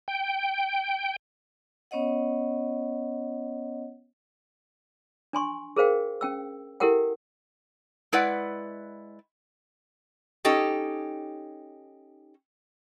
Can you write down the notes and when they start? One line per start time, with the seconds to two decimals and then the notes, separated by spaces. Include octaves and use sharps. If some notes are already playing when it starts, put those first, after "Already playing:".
0.08 G5
1.91 B3 C#4 C#5 D#5 F#5
5.33 D4 G#5 C6 C#6
5.76 G#4 A#4 C5 F5 G5
6.21 C#4 G5 E6
6.80 E4 G4 A4 A#4 F#5 G5
8.12 G#3 E4 B4 D5 F#5
10.45 C#4 D#4 G4 A4